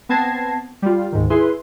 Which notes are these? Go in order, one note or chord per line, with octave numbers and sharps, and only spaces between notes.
B3 C4 A5 G#6 A#6 C7
G3 F4
D2 G#2 D#3
E4 G#4 B4 C6